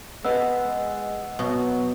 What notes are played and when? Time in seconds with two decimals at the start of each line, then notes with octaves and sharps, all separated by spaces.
0.25 G#3 B3 D#5 F#5 E6
1.39 B2 F#3